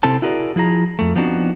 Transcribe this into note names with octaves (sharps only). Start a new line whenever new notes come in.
C3 C4 E4 A4 C5 A5
E4 F#4 G#4 A#4 C#5 D5
F3 E4 G#4 A#5
F2 A3
F3 B3 C4 D4 D#4 F#4